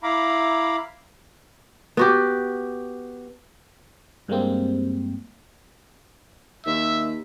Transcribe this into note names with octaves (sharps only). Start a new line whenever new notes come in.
E4 F5 A#5 B5 D6
B3 F#4 G4
G2 G3 G#3 A#3 C4
D#2 E5